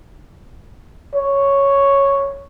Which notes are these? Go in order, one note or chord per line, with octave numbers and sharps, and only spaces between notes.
C#5